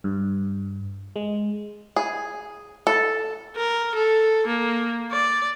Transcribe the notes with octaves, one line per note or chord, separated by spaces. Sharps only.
G2
G#3
G#4
A4
A#4
A4
A#3
D5